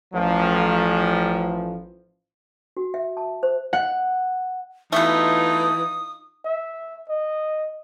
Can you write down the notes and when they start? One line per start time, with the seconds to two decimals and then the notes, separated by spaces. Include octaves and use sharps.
0.14 A1 F3
2.77 F#4
2.94 E5
3.17 A5
3.43 C5
3.73 F#5
4.92 B2 E3 A3 D#4 F4 D#6
6.45 E5
7.09 D#5